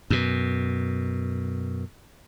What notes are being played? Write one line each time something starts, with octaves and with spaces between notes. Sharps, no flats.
F#2 B2